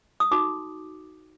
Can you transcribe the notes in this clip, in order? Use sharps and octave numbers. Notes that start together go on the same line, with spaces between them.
D#6
D#4 F#4 A4 D6